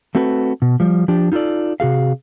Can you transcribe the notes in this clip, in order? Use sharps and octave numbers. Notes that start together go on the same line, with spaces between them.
A3 C4 F#4 A4 B4
B2
F3 G3
F3 D4 G4
D#4 F4 G#4 A4 D5
C3 F#4 G#4 F5